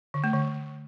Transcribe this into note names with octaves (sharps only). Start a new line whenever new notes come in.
D3
A3
D3